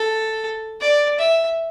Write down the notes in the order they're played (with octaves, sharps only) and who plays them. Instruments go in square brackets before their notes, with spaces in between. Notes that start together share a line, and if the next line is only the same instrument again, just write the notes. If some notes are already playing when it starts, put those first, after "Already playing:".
Already playing: [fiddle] A4
D5
E5